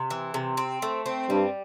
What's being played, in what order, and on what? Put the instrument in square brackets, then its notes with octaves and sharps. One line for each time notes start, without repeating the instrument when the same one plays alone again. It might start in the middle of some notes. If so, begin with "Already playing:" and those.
Already playing: [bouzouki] C3
E3
C3
C4
A3
C4
[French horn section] G2 [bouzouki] G3